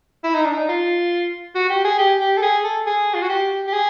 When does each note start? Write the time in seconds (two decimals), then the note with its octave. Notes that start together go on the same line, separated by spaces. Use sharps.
0.24 E4
0.35 D#4
0.44 D4
0.54 D#4
0.68 F4
1.55 F#4
1.69 G4
1.84 G#4
1.98 G4
2.20 G4
2.37 A4
2.42 G#4
2.64 A4
2.86 G#4
3.14 F4
3.22 F#4
3.29 G4
3.67 G4
3.73 G#4